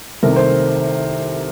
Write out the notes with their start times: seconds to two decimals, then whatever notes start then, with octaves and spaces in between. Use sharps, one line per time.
0.23 C2 C3 D#3 A3 A#4
0.36 C5